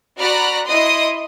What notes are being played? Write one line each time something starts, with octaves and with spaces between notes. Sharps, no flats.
F#4 D5 A#5 B5 F6 F#6
E4 D#5 C6 D#6